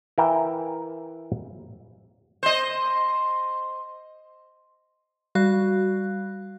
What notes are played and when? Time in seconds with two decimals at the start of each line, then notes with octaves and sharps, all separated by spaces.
0.18 E3 A#4 E5 G5 A#5
2.43 C5 D#5
5.35 G3 F#4 F5 F#6